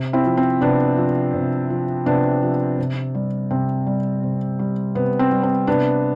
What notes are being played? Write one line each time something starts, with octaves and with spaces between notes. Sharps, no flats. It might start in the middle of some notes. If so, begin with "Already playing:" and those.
Already playing: C3
C4 E4
F3
C4
C3 B3 D4
F3
C3
F3
C3 B3 D4
F3
C3
G3
C3 C4
G3
C3
G3
C3 B3
C4
G3
C4
C3 B3 D4